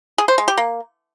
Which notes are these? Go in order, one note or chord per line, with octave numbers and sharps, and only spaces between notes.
G#4
C5
G#3
G4
A#3